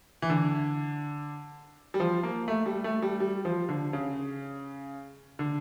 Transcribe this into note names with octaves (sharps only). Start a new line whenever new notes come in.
E3
D3
G3
F3
A#3
A3
G3
A3
G3
G3
F3
D3
C#3
D3